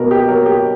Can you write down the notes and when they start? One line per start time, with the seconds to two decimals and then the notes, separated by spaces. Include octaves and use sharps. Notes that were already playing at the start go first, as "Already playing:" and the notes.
Already playing: B2 B3 A#4
0.11 G4
0.28 F#3 A#4
0.46 G4